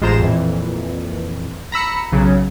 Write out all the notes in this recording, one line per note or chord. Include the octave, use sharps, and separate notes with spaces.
A1 G#3 F4 C5 A#5 E7
F2 A#2 E3
A#5 B5 E6 C#7
B1 C#3 F#3